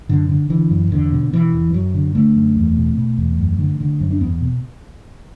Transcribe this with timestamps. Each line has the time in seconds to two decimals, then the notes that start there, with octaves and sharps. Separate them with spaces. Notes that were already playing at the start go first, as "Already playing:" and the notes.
0.09 F#2 D3
0.29 D3
0.50 D3 E3
0.70 F#2
0.91 E2 D3
1.12 B2
1.33 B2 E3
1.54 E2
1.73 F#2 F#3
1.94 D3
2.15 D3 A3
2.36 F#2
2.56 E2
2.76 B2
2.97 B2
3.18 E2
3.38 F#2
3.59 D3
3.80 D3
4.00 F#2
4.11 D4
4.20 E2 B3
4.41 B2